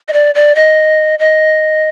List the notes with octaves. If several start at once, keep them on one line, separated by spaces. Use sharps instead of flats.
D#5
D5
D5
D#5
D#5